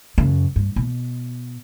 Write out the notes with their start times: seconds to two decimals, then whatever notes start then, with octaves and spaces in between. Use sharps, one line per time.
0.18 F#2 C#3
0.56 G2
0.76 B2